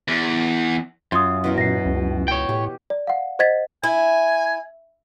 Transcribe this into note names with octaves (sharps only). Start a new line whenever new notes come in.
E2
F#2 F4 C6 D#6
B2 E3 A#4
A#2 A#6 C7
C#2
C#5 G5
A2 G4
D5
F5 F#5
C5 D#5 F#5 G#6 A6 B6
E4 G#5